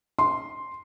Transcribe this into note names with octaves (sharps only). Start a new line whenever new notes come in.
C6